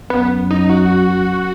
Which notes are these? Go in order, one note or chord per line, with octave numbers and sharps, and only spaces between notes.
F#2 B3
D#4
F#4